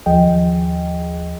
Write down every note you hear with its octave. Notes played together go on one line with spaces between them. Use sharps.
D#2 F3 G#4 D#5 G5